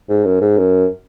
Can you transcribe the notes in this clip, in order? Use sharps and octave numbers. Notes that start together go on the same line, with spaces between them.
G#2
F#2
G#2
F#2